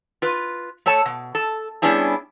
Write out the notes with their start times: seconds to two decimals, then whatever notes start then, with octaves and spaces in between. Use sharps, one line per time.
0.22 F4 B4
0.86 A3 A4 C#5 A5
1.06 B2
1.35 A4
1.82 G3 B3 C#4 D4 E4 G#4